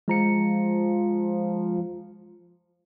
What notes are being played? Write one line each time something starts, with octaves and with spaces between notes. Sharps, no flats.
F3 G#3 A#5 C#7